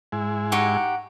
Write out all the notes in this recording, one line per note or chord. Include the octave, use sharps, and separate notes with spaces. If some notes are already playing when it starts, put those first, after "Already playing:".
G#2 G#3 E4
D#4 G4 F#5 C#6